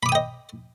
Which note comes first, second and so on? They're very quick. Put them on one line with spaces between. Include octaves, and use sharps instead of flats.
B5 D6 D#6 G5 D#5